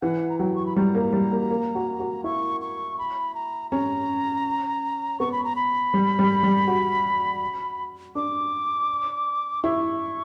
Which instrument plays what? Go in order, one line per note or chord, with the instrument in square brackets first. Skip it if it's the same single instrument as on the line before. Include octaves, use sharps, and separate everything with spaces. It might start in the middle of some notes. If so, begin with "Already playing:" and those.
[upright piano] E3 [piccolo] F#5
[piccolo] A#5
[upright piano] F#3 [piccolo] G5
[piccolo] C#6
B5
[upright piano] G3 [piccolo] A#5
[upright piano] A#3
G3
A#3
A#3
F#4
F#4
[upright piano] E4 [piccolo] C#6
[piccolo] C#6
B5
A#5
[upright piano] C#4 [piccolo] A#5
[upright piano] B3 [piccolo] C#6
[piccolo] B5
A#5
B5
[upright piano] G3
G3
G3
F#4
[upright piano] D4 [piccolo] D6
[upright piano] E4 [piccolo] C#6